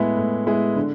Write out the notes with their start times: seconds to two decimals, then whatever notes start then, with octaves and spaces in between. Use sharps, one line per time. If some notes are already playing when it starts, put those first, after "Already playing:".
Already playing: A2 G#3 B3 E4 G#4
0.17 A2
0.46 G#3 B3 E4 G#4
0.76 D3